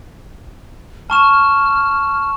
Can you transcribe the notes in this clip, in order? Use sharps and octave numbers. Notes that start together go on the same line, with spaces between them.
A5 C#6 F6 E7